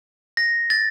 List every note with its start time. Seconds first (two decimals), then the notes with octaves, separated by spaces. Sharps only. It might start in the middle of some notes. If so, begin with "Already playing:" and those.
0.37 A#6
0.70 A6